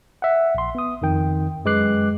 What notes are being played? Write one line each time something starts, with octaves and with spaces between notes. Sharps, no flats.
E5 F#5
A#1 C6
B3 D#6
F2 D#3 G5
F#2 G#3 B4 D6 F#6 C7